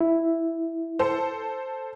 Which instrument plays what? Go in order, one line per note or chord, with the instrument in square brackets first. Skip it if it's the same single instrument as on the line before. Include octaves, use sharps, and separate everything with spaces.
[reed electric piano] E4
[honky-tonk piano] A4 C5